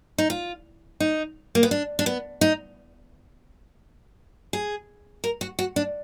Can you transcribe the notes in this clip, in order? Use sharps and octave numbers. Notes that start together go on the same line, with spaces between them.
D#4
F4
D#4
A#3
B3
D4
D4
B3
D#4
G#4
A#4
F#4
F#4
D4